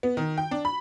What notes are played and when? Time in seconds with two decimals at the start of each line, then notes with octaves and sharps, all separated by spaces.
0.03 B3
0.17 D#3
0.38 G5
0.51 D4
0.65 B5